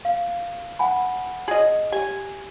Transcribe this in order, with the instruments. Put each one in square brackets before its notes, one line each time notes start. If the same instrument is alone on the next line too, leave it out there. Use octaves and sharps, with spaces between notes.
[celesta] F5
F#5 G#5 B5
[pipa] G#4 D#5
[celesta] G4 [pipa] G#5